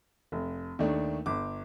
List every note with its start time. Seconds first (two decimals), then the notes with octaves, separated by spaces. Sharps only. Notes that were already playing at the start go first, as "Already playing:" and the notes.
0.32 F1
0.79 D#2 D#3 A3 D4
1.26 G1 D6